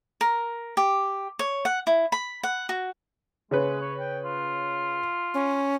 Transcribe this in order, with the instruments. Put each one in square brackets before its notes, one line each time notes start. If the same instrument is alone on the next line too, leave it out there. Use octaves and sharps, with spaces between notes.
[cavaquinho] A#4
G4
C#5
F#5
E4
B5
F#5
F#4
[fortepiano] C#3 C#4 B4 [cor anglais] G#3
[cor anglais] C#5
G5
F4
[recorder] C#4